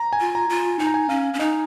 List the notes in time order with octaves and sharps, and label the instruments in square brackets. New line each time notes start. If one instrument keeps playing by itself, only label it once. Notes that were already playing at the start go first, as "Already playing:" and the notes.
Already playing: [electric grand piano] A#5
G#5
[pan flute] F4
[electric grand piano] A#5
[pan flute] F4
[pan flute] D#4 [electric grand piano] G#5
[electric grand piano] A#5
G#5
[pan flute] C#4 [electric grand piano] F5
[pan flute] C#4
[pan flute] D#4 [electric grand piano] D#5